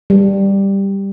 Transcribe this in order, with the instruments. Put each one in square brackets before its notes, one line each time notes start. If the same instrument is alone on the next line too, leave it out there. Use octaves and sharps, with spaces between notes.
[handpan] G3